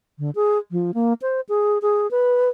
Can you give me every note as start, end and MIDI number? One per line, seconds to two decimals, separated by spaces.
0.19 0.31 50
0.35 0.58 68
0.71 0.92 53
0.94 1.13 58
1.22 1.41 72
1.49 1.78 68
1.82 2.09 68
2.11 2.49 71